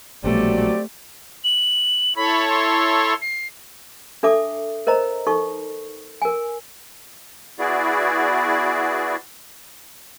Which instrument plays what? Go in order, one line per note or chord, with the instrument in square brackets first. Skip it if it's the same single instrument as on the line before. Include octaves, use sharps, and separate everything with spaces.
[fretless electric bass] A#1 B2 G3 [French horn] F#3 [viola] A3 [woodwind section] C4 G4 D5
[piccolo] F#7
[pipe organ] E4 A4 C#5 [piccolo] B5
[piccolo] C6
C7
[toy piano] D4 A4 E5 A5 D6 D#6
A#4 C5 D#5 A#5
D#4 A4 C#6
A#4 G#5
[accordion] B3 E4 F#4 G#4 D5